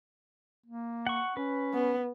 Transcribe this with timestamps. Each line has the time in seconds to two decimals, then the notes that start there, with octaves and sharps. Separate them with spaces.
0.66 A#3
1.07 F#5 C#6
1.37 C#4 B4
1.73 B3